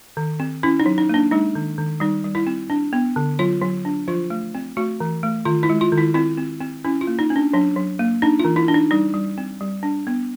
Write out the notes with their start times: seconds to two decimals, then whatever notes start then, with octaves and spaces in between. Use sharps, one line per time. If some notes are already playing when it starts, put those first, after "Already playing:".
0.17 D#3
0.40 C4
0.63 C#4 E4
0.80 D#4
0.86 F#3
0.98 D#4
1.09 A#3 D4
1.31 G#3 D#4
1.55 D#3
1.78 D#3
2.00 G3 D#4
2.24 G3
2.35 E4
2.47 C4
2.70 D4
2.93 B3
3.16 D3
3.39 F#3 F4
3.62 F#3
3.85 D4
4.08 F3 F4
4.30 A3
4.55 C4
4.77 A3 F#4
5.00 E3
5.23 A3
5.45 D#3 F4
5.63 E4
5.69 G#3
5.81 F4
5.92 D#3
5.98 E4
6.14 C4 E4
6.38 C4
6.60 C4
6.85 C#4 E4
7.01 F4
7.07 A#3
7.19 D#4
7.30 C#4
7.36 D4
7.53 F#3 D4
7.76 F#3
7.99 A#3
8.22 D4 D#4
8.39 F4
8.45 E3
8.56 E4
8.68 D4
8.74 D#4
8.91 G3 D#4
9.14 G3
9.38 C4
9.61 G3
9.83 D4
10.07 B3